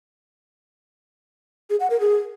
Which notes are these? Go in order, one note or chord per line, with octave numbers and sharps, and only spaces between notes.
G#4
F#5
A#4
G#4